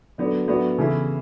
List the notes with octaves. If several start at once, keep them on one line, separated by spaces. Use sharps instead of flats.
D3 F#3 B3 D4
A2 F#3 B3 D4 F#4
E2 C#3 E3 A3 E4